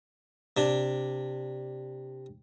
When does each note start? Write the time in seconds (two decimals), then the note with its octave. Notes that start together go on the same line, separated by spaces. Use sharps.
0.57 C3 D4